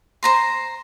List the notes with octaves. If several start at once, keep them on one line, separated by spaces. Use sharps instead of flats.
C5 A#5 C6